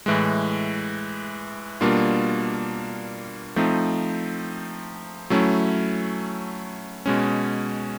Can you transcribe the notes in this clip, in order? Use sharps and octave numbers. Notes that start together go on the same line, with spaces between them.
A2 E3 G#3
B2 G3 A#3 D4 F4
F3 A3 C4 D#4
F#3 A3 C#4 E4
B2 G#3 C#4